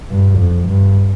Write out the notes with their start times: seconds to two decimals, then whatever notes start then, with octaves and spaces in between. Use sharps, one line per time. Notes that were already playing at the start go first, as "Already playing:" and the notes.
0.11 G2
0.39 F2
0.68 G2